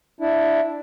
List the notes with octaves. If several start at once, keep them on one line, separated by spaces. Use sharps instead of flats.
D4 E4